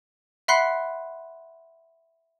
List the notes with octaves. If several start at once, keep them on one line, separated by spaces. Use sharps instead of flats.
E5 F#5 B5 C6 F#6 C7